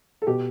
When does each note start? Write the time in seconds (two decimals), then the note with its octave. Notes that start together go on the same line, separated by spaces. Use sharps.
0.22 A4
0.27 B2 G4